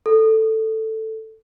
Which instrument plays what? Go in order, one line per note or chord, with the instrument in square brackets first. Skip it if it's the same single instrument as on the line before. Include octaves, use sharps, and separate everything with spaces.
[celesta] A4